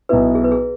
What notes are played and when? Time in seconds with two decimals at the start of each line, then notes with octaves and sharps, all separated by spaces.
0.09 B1 B2 B3 E4 B4
0.35 G#4
0.44 B4
0.52 G#4